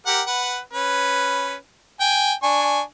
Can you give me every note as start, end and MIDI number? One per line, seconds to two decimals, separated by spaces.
0.07 0.21 67
0.07 0.21 70
0.07 0.21 78
0.27 0.59 71
0.27 0.59 78
0.73 1.55 61
0.73 1.55 71
2.00 2.33 79
2.00 2.33 80
2.43 2.81 62
2.43 2.81 80
2.43 2.81 85